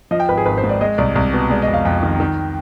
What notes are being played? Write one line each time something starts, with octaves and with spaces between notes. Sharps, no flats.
F3 D#5
G5
G#1 B4
G#4
G#1 B4
C5
G#2
D5
G#3 D#5
C2 D5
C2
B2
G#3 D5
D#5
F2
F5
F2 G5
D#3
D#3